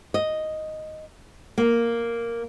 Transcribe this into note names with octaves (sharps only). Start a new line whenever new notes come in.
D#5
A#3